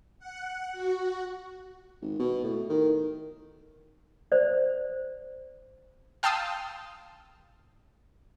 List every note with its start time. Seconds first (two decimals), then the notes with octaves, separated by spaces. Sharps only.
0.19 F#5
0.73 F#4
2.02 G#1
2.19 B2
2.44 A2
2.70 D#3
4.32 C5 D5
6.23 F5 G5 A5 C6 D#6 E6